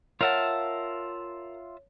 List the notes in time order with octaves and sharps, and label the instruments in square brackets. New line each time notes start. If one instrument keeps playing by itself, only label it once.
[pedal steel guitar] F4 E5 A5 [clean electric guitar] A#4 F#5 [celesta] C#5